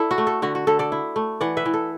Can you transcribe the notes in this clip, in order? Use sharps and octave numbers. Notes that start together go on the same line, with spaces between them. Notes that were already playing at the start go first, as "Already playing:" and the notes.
Already playing: E4 A4 D5
F#4
A3
A4
D3 F#4
F#4
D3 A4
A4 D5
E4
A3
E3 D5 F#5
B4 E5
E3
A4